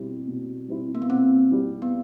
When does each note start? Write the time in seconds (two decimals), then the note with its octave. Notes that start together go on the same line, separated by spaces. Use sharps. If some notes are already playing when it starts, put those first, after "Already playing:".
Already playing: B2 G3 C4 E4
0.27 B2
0.68 G3 C4 E4
0.95 A#3
1.02 B3
1.09 B2 C4
1.51 G3 C4 E4
1.82 B3